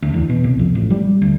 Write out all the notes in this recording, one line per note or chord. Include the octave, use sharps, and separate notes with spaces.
D2
E2
B2
C2
F2
A1
G3
D2